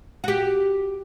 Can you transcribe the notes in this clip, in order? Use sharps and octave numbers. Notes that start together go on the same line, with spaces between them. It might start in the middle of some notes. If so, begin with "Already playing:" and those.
F#4 G4